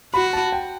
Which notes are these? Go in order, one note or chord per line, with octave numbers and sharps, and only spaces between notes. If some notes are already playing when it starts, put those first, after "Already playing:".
F#4 B5
A5
G5